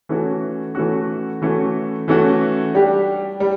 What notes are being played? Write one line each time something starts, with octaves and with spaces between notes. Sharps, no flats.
E3 A3 C#4 F#4
E3 A3 C#4 F#4
E3 A3 C#4 F#4
E3 A3 C#4 F#4
G3 D4 G4
G3